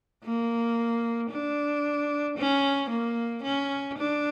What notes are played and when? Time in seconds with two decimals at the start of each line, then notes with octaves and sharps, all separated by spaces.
0.24 A#3
1.30 D4
2.38 C#4
2.90 A#3
3.43 C#4
3.98 D4